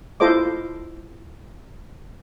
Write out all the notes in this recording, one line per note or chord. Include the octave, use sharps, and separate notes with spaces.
E4 F4 A4 C5 D#5 D6